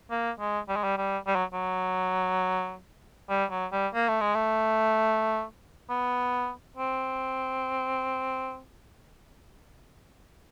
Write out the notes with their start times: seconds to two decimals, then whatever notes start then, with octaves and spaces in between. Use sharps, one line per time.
0.11 A#3
0.39 G#3
0.69 G3
0.76 G#3
0.84 G3
0.98 G3
1.27 G3
1.35 F#3
1.53 F#3
3.30 G3
3.51 F#3
3.72 G3
3.94 A#3
4.08 A3
4.21 G#3
4.35 A3
5.90 B3
6.77 C4